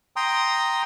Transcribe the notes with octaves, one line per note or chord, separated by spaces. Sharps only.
G5 A#5 C6 D#6